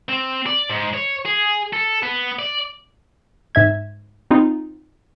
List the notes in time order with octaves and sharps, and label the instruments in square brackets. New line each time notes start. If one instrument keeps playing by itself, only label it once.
[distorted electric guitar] C4
D5
G#2
C#5
G#4
A4
B3
D5
[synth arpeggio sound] G#2 E5 G#6
C4 D#4 F4